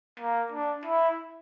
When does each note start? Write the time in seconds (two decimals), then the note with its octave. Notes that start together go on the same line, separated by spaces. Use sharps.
0.20 A#3
0.52 D4
0.85 E4